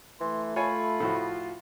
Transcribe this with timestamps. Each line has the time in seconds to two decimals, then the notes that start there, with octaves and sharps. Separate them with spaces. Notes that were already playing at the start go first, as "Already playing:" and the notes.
0.21 E3 A3 C6
0.56 F4 C#5 G#5 A5 B5
1.00 A2 F3 F#4